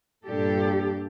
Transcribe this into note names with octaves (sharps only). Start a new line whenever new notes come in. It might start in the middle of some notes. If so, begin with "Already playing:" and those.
G2 A#2 D4 G4 A4